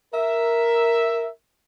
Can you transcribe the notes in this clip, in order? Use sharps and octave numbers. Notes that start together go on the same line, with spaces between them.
A#4 E5